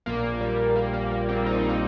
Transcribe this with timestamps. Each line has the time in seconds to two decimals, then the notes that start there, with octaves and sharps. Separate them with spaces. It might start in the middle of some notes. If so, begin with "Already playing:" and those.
0.06 A#1 A#2 A#3
0.41 G3
0.76 A#3
0.93 A#3
1.11 A#3
1.29 G3 C4
1.46 D#4
1.57 C4
1.69 A#3 D#4